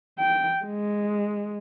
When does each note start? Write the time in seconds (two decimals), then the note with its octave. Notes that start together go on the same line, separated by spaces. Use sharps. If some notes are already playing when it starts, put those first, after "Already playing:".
0.19 G5
0.65 G#3